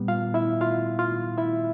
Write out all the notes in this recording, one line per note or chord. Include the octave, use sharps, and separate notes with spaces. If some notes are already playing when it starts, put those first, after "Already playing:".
Already playing: A#2 G3 B3
F4 F5
E4 E5
F4 F5
F4 F5
E4 E5